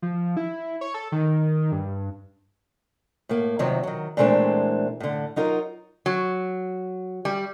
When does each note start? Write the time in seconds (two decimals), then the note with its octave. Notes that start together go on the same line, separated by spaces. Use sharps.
0.02 F3
0.37 E4
0.81 C#5
0.94 A4
1.12 D#3
1.72 G2
3.29 A2 A#3
3.59 E2 C3 D#3 F3 F#3
3.83 D#3 F#3
4.17 A#2 E3 G#3 A3 C4 D4
5.00 A2 D3
5.36 F#3 D#4 F4 A#4
6.06 F#3
7.25 G3